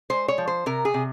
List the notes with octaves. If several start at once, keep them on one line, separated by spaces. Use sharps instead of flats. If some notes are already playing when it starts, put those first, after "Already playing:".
G#3 C5
C#5
F3
C5
C3 A#4
G#4
C3